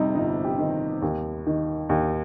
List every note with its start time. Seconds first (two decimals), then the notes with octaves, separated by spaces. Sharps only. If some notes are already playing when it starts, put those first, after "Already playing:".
Already playing: F2 C3 G3 D#4
0.15 G1 D#4
0.44 G4
0.58 D#3
1.02 D#2
1.47 D#3
1.89 D#2